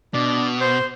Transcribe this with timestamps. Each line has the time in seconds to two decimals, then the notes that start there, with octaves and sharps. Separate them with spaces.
0.14 B2 D4
0.61 C5